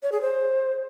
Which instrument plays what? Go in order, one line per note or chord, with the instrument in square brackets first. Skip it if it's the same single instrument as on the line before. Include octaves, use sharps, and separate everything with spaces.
[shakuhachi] C#5
G#4
C5